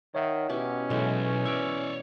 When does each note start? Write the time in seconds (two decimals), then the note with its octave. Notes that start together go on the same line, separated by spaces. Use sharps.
0.15 D#3 C#5 E5 F#5
0.49 B2 C#4 E4 G4
0.90 B1 E3 G#3 A4 C#5 E5
1.45 B4 C#5 D5 E5 E6